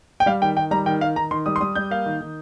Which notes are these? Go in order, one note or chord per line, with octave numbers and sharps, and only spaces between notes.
G5
G3 F5
D#3 G5
D#3 G5
G3 A#5
D#3 G5
D#3 F5
D#3 A#5
D#3 C6
G3 D#6
C6
G3 D#6
G3 G6
A#3 F5
D#3
D#3